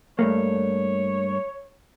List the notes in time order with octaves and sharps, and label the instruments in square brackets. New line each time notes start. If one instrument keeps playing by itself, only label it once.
[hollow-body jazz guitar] G2 A3 A#3 [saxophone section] C#5